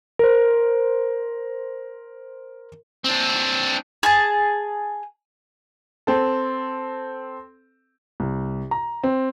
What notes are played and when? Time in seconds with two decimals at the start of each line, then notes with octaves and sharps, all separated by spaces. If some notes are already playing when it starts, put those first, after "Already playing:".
0.19 A#4 C5
3.04 C4 D4
4.03 G#4 A5
6.07 C4 A4
8.20 C2
8.71 A#5
9.03 C4